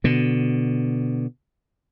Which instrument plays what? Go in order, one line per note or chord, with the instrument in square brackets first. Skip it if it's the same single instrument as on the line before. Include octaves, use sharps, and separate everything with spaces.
[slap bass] B2 D3